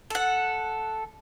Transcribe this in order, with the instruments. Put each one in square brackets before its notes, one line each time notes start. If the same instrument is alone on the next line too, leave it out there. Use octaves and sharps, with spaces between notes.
[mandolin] A4 F#5